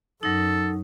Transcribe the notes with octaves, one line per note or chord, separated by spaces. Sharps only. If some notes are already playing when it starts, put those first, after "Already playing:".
F#2 F#3 D#4 A4